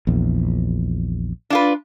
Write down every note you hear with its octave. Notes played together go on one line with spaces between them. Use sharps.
A#1 E2
D4 F4 B4